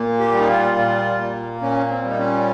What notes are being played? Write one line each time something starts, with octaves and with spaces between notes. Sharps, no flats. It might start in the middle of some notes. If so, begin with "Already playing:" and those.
Already playing: A#2 A#3
G4
G3
D#4
F4
A#2
A#3
A#2 C#4
C4
G3
D#4
C#4